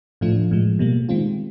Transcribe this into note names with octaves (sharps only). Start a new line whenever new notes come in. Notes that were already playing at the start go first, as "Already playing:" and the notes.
A2 F3 A3 D4 F4
A2 F3 G#3
B2 G3 A#3
D#3 G#3 C4 F4